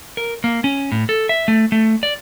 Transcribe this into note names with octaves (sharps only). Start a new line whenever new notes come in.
A#4
A#3
C#4
A2
A4
E5
A3
A3
D5